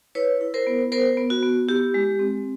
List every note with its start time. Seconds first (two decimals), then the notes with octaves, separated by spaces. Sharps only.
0.15 E4 B4 C#5
0.41 E4
0.54 A#4 C5
0.67 B3
0.92 B3 A#4 C5
1.17 B3
1.30 F#4
1.43 B3
1.68 E4 G4
1.94 G#3
2.19 C4